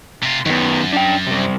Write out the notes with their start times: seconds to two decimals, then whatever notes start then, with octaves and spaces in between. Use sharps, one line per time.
0.23 C3 F4
0.46 F#2 D#3 B3
0.93 D4 G5
1.27 C3 G3